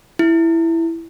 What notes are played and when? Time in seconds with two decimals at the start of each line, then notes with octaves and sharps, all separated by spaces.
0.19 E4